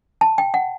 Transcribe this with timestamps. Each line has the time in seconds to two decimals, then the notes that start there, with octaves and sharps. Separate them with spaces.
0.21 A5
0.38 G5
0.54 F#5